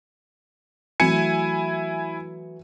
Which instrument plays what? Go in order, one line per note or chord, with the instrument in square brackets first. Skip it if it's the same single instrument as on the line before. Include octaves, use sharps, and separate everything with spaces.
[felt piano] E3 F#3 A3 [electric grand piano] E4 G#5 C#7